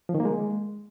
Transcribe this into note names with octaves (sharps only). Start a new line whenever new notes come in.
F3
D#3
A#3
G#3